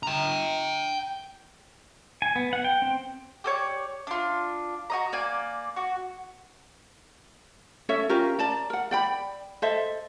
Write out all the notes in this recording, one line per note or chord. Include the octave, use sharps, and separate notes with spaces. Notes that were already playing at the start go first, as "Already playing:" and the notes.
G5 A#5
G#5
B3
F#5
G5
C4
G4 A4 C#5 D5
D4 F4
F#4 D#5 A#5
A#3 D5 G#5
F#4
C#4 A4 C#5 E5
C#4 F4 G4 A#4
D5 A5 A#5
A#4 F#5
D5 G5 B5
A4 C5 D#5 E5